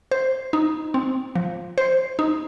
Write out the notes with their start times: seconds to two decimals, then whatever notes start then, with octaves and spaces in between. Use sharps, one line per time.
0.11 C5
0.53 D#4
0.94 C4
1.36 F3
1.78 C5
2.19 D#4